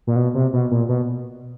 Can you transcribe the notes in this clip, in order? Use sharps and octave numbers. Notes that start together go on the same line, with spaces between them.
A#2
B2
C3
B2
A#2
B2